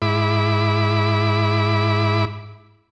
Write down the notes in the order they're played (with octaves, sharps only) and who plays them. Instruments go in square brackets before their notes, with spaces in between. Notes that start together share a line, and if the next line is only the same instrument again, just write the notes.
[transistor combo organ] G#2 E4 B5 D6